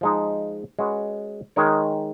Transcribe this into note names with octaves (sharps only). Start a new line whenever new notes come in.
F3 G#3 D#4
G#3 C#4 F#4 B4
D#3 G#3 D#4 A#4 C#5